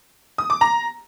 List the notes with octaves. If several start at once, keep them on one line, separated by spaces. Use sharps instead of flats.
D#6
D6
A#5